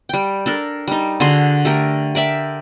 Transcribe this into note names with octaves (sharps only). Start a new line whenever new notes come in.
G3 G5
D4 A4 A#4
G3 D#4
D3 F#4 G#4 C6
A3 G4 A#4
A#4 D5 E5 G5